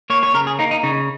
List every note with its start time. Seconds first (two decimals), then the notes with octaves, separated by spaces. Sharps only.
0.10 A#3 C#5
0.23 C#5
0.34 C#3 A#4
0.47 G#4
0.59 A#3 D#4
0.71 D#4
0.83 C#3 D#4